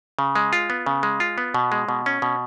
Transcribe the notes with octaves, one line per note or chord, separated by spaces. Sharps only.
C#3
G#3
F4
B3
C#3
G#3
F4
B3
B2
G#3
B2
C#4
B2